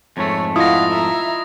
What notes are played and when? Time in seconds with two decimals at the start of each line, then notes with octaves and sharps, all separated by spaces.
0.17 F2 G#2 A3 C#5
0.56 E4 F4 D#5 F5 F#5 D#6 A#6
0.91 E5 A#5